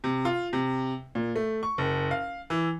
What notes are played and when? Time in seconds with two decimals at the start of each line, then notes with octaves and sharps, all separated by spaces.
0.04 C3
0.25 F4
0.53 C3
1.15 A#2
1.36 A3
1.63 C#6
1.78 F#1
2.11 F5
2.50 E3